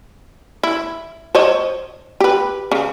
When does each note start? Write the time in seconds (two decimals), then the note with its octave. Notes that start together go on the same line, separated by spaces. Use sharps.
0.63 E4
1.35 C5 C#5 D#5
2.20 G4 B4
2.72 C#3